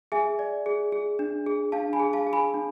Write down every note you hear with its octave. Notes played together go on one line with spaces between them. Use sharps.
G#4 E5 G#5
D5
G#4
G#4
D4
G#4
D4 F5 A5
G#5 B5
G#4
F5 A5
G#4
G#5 B5
D4